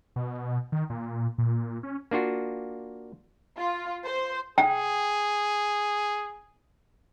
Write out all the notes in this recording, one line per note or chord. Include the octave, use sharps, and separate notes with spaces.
B2
D#3
A#2
A#2
C#4
A#3 D4 F4 F#4
F4
C5
G#4 G5